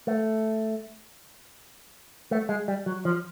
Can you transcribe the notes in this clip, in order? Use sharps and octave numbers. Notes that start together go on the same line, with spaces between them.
A3
A3
G#3
G3
F#3
F3